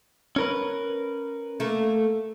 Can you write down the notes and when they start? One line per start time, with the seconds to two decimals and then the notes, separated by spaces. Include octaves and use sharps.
0.36 C#4 A#4 B4
1.60 A3 A#3